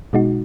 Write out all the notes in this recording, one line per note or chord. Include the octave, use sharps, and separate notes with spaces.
B2 G#3 D#4 F#4